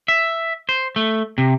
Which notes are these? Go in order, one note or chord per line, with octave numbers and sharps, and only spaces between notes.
E5
C5
A3
C3